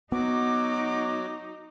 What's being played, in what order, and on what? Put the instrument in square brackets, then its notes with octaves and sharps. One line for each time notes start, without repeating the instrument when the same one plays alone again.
[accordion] F#3 F#4 [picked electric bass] B3 [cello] D#4 [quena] D6